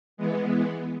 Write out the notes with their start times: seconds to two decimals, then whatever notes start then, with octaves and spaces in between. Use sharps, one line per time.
0.17 E3 G#3 B3